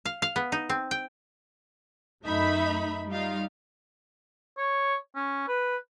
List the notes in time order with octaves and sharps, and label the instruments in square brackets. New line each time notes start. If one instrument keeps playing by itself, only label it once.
[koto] F5
F5
B3
D#4
C4
G5
[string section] F#2 A3 D#4 E5 B5
G3 D#4 F4 F5
[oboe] C#5
C#4
B4